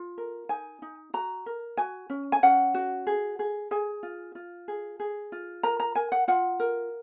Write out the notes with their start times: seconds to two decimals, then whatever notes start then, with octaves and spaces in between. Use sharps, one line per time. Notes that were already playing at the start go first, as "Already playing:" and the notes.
Already playing: F4
0.18 A#4
0.49 D#4 G#5
0.82 D#4
1.14 F#4 A#5
1.46 A#4
1.77 F#4 G#5
2.10 C#4
2.32 G#5
2.43 C#4 F#5
2.74 F#4
3.07 G#4
3.39 G#4
3.71 G#4 G#5
4.03 F4
4.35 F4
4.68 G#4
5.00 G#4
5.32 F4
5.63 A#4 A#5
5.80 A#5
5.95 A#4 G#5
6.12 F#5
6.28 F4 F#5
6.60 A#4